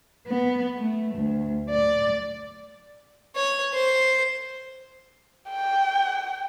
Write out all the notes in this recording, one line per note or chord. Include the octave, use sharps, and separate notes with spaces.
B3
A3
D2
D5
C#5
C5
G5